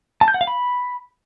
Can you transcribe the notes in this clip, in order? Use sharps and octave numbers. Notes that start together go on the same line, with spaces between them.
A5
G6
F#5
F5
B5